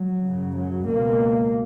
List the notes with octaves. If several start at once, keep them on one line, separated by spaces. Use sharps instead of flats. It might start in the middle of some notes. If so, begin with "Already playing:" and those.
Already playing: F#3
F#2 C#3
F#3
C#2 B2 A#3